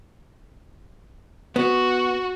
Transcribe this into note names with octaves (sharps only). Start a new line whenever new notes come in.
B3 F#4